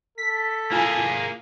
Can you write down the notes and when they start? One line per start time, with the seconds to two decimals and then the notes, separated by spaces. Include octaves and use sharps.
0.18 A4 B6
0.72 A#3 E4 F4 G#4 G#5